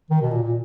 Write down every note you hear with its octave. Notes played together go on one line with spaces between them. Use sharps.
D#3
B2
A#2
A#2